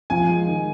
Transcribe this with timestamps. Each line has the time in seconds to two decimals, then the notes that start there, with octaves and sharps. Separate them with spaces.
0.10 F3 G#5
0.29 G#3
0.47 D#3